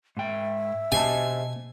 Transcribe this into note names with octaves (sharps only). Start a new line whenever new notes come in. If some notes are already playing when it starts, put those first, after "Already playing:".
G#2 E5 G5
B2 G4 C5 D#5 G#5 A5